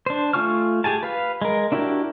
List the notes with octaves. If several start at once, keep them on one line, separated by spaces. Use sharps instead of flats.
D4 C5
A3 F4 G#5 C#6 F6
G4 G#4 G#5 A5
B4 F5
G#3 A#4
D4 E4 F#4 G4 A#4